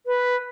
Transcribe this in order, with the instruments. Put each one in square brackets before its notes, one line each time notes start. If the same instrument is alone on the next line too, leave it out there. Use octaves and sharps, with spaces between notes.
[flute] B4